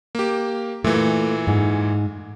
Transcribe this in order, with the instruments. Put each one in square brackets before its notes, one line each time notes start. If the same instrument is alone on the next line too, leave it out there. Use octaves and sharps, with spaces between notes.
[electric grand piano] A#3 G4
[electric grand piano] A#2 E3 [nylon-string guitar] A3
[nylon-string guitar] G#2